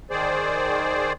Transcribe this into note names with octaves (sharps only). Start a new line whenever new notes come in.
D#3 G#4 C5 D5